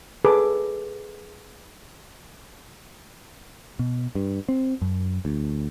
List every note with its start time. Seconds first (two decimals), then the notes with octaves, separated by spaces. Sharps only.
0.25 G#4 A4 B4 D6
3.79 B2
4.15 G2
4.49 C4
4.82 F#2
5.25 D2